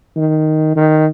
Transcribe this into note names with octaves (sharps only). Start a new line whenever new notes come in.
D#3
D#3